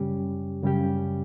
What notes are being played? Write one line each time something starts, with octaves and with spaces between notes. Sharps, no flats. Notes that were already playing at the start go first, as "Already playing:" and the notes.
Already playing: F#2 C#3 G3 C#4 G4
F#2 C#3 G3 C#4 G4